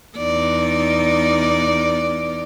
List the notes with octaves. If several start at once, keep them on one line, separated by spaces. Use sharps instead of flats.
E2 D#4 D5